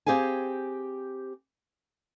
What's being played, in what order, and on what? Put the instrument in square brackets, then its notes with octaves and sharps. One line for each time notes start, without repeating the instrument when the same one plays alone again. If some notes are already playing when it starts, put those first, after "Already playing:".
[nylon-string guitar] C4 G4 G#4 F5 G#5